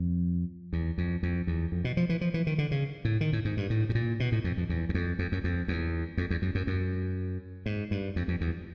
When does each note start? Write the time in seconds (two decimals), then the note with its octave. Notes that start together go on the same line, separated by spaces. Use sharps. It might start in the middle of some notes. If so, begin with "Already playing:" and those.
Already playing: F2
0.73 E2
0.98 F2
1.23 F2
1.47 E2
1.72 F2
1.84 B2
1.97 F3
2.09 E3
2.21 F3
2.34 E3
2.47 D#3
2.58 D3
2.71 C#3
3.05 A2
3.21 D#3
3.33 A2
3.45 G#2
3.57 G2
3.70 A2
3.89 A2
3.95 A#2
4.20 B2
4.32 A2
4.44 F2
4.57 F2
4.69 E2
4.89 E2
4.94 F2
5.19 F2
5.32 F#2
5.44 F2
5.68 E2
6.17 F2
6.30 E2
6.42 F#2
6.55 F#2
6.67 F#2
7.66 G#2
7.91 G2
8.16 F2
8.28 F2
8.41 E2